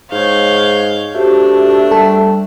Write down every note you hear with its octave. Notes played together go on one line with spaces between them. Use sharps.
G#2 C#5 F5 G6
A3 D4 F#4 G4 C5
G3 A4